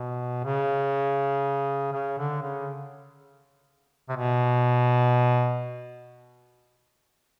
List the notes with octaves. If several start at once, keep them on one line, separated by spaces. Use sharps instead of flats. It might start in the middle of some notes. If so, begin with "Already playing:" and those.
Already playing: B2
C#3
C#3
D3
C#3
C3
B2